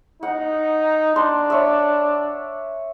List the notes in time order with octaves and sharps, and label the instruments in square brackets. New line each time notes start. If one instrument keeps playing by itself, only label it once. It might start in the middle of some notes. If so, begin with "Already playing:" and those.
[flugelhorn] D#4 [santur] F#5
[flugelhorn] D4 [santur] C6
[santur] C#5 E5